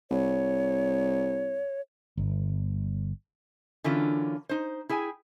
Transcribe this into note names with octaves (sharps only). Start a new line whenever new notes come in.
C2 C#5
G1
D3 E3 F#3 A#3 C#4 F4
D#4 C5
E4 G#4 G5 G#5